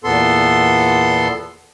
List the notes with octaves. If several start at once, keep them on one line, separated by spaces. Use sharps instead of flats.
E2 A#2 B3 A4 C6